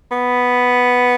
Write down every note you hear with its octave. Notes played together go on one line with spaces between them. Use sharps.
B3